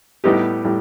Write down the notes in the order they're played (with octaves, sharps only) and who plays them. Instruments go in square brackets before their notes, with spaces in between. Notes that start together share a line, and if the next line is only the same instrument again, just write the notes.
[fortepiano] A2 G3 B3 D#4 G4
A2 G3